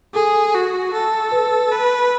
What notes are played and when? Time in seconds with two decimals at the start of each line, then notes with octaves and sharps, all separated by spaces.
0.15 G#4 A4
0.55 F#4
0.94 A4
1.32 B4
1.72 B4